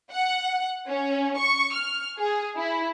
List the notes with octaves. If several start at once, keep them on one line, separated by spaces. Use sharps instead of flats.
F#5
C#4
C#6
F6
G#4
E4